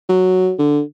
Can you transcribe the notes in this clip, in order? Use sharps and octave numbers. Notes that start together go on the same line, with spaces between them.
F#3
D3